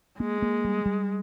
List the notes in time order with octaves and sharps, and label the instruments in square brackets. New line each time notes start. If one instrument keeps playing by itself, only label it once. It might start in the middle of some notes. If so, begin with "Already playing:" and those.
[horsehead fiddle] G#3 [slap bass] A#3
[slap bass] A#3
G3
G3